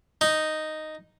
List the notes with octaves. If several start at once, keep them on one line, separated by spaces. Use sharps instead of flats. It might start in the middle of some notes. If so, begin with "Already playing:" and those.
D#4